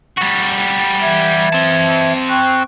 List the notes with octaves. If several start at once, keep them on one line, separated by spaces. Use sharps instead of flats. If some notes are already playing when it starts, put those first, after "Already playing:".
G3 F#4
E3 E5 G#6
C4 A5
G5 C#6 F#6